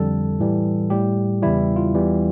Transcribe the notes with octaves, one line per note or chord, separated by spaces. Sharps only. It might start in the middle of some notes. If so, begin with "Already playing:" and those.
Already playing: F2 D3 G3 A4
A2 E3 G3
A2 G3 G4
E2 C#3 E3 G3 E4
F4
E2 E3 G3